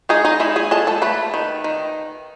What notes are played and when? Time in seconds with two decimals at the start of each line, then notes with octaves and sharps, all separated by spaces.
0.09 G#3 D#4 G#4
0.25 D#4 D#5
0.40 G#3 E4 E5
0.56 G#4 G#5
0.71 G#3 A4 A5
0.87 A4 A5
1.02 A3 B4 B5
1.34 D#3
1.64 D#3